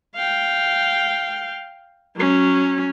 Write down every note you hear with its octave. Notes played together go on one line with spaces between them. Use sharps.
F5 G5
F#3 C#4